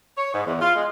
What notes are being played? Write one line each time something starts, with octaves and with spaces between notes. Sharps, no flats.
C#5
G#2
E2
F4
G#3